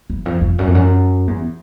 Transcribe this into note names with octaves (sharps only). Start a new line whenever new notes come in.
E2
F2
F2
F#2
F2
F#2
E2